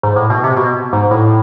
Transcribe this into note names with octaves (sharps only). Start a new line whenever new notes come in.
G#2
A2
B2
C3
B2
G#2
A2